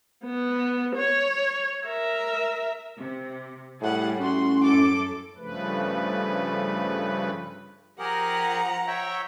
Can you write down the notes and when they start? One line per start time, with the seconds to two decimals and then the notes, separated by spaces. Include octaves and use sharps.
0.24 B3
0.96 C#5
1.86 A#4 E5
2.99 C3
3.81 A2 G3 G#4 F#5
4.20 A2 C#4 F#4 C6
4.64 F#2 A4 D6
5.37 G2 C#3 F3 A3 B4
7.99 F3 G4 G#4 A#4 F#5 A#5
8.87 C#5 E5 G5